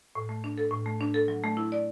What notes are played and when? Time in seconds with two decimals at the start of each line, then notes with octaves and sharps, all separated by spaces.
0.15 A2
0.29 A3
0.44 D4
0.58 A4
0.71 A2
0.86 A3
1.01 D4
1.14 A4
1.28 F#3
1.44 A3
1.57 E4
1.72 D5